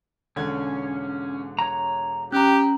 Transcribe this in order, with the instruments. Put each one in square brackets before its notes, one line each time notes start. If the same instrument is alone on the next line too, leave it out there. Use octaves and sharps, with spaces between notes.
[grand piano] E1 D3 G#6 [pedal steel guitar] C#4
[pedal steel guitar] C#5 A#5
[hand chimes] C#4 A#5 [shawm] G4 [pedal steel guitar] F#6